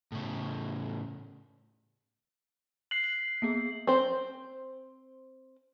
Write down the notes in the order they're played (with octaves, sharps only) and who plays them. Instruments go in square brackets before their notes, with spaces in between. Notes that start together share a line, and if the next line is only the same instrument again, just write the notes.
[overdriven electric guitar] A2 C#3
[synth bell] F#6 [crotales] C7 F#7
[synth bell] B6 [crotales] F#7
[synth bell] A#3 B3 G#4
[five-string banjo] C4 C5